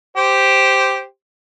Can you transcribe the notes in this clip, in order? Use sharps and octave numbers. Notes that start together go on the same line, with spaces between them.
G4 C5